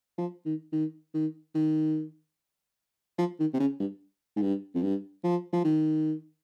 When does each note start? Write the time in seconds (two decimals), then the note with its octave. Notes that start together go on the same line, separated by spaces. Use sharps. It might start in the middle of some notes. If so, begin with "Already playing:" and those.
0.18 F3
0.46 D#3
0.73 D#3
1.14 D#3
1.55 D#3
3.19 F3
3.40 D#3
3.54 C3
3.60 C#3
3.80 G2
4.36 G#2
4.42 G2
4.75 F2
4.82 G2
5.24 F3
5.53 F3
5.64 D#3